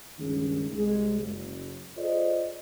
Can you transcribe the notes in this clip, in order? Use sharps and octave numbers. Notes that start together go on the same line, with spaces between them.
C#2 G2 D#3 G#3 C#4
C2 G#3
F#1
F4 G#4 A4 C5 D5 D#5